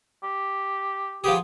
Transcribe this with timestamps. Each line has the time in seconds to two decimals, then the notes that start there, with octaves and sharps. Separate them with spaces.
0.23 G4
1.24 F3 B3 G4 G#4